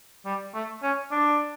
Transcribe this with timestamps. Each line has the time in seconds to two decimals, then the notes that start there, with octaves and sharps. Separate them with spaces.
0.25 G3
0.54 A3
0.82 C#4
1.11 D4